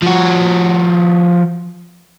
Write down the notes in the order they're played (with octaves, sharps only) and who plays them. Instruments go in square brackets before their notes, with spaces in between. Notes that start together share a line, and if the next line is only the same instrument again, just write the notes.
[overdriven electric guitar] F3 F#4